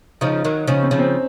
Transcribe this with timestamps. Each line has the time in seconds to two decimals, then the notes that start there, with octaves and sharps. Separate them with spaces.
0.21 C#3 F3 D#4
0.44 D#3 F#3
0.67 C#3 F3 C#4
0.83 C4
0.91 C#3 F3
0.99 C4